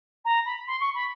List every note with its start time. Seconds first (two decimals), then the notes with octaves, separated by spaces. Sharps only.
0.25 A#5
0.45 B5
0.67 C6
0.80 C#6
0.94 B5